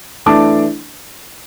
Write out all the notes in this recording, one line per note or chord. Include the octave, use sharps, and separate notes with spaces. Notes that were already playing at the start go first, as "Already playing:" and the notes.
E3 A3 D4 A5 D6